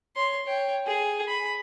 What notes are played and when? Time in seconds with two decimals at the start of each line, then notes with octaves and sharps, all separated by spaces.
0.16 C#5 C6
0.45 C#5 G5
0.86 G#4
1.27 B5